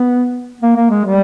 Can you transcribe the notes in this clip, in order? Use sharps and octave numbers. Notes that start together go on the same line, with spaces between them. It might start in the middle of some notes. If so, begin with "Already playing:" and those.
Already playing: B3
A#3
A#3
G#3
G3